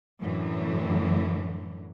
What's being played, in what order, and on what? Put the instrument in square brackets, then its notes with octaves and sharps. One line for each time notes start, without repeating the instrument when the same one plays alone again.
[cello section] F#2 A2 D3 E3 F#3